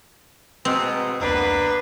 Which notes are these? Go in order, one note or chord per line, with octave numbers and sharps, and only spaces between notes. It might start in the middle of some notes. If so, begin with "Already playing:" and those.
G#2 B2 C4
F1 C#2 A#3 B3 D4 B4